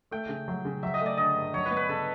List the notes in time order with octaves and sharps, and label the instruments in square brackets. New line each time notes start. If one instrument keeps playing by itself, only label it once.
[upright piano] A3 [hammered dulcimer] G5
[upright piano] C#3
F#3
C#3
[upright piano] F#3 [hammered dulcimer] E5
[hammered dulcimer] D#5
[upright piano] A3 [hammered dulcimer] D5
[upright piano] D3 [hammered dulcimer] D#5
[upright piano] G2
[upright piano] F#3 [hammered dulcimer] C#5
[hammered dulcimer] B4
[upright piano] B3
[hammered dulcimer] B4
[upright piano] C#3 [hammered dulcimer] A4